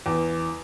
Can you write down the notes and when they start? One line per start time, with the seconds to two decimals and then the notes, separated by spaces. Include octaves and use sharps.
0.06 E2